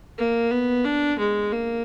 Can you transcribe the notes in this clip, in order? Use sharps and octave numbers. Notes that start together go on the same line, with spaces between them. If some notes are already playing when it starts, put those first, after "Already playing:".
A#3
B3
D4
G#3
A#3